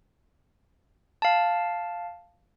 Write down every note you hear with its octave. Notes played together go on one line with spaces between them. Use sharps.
F5 A5